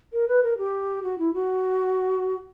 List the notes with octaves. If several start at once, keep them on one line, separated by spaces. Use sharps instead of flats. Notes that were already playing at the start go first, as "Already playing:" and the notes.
A#4
B4
A#4
G4
F#4
E4
F#4